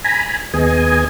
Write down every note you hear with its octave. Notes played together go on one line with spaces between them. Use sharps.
G#5 A#5 B5
D#2 B3 G#4 D#5 G#5